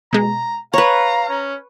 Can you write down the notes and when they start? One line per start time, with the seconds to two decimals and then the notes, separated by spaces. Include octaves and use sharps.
0.13 B2 G#3 A#5
0.73 B4 C#5 F5 A#5
1.29 C#4